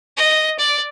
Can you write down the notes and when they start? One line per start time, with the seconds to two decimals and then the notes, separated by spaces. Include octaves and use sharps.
0.17 D#5
0.59 D5